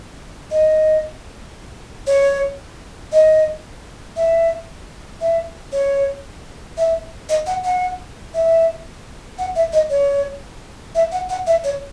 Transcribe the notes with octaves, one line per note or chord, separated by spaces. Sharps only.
D#5
C#5
D#5
E5
E5
C#5
E5
D#5
F#5
F#5
E5
F#5
E5
D#5
C#5
E5
F#5
F#5
E5
C#5